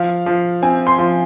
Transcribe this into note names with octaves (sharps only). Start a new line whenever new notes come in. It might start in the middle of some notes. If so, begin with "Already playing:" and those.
Already playing: F3 F5
F3
C4 G#5
C6
F3 C6